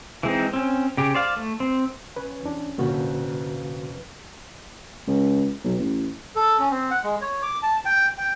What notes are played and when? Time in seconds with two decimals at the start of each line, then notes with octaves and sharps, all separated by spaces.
0.23 E3 G#3 C4 D#4
0.54 C4 C#4
0.97 C#3 G4
1.14 C5 D5 F5
1.37 A3
1.60 C4
2.16 C#4 B4
2.43 E2 D4
2.78 F1 F2 A#2 D3 F#4 B4
5.07 C#2
5.64 B1
5.79 A1
6.35 A4
6.59 C#4
6.70 C4
6.91 F#5
7.04 G#3
7.21 C#5
7.42 D6
7.63 A5
7.86 G5
8.18 G5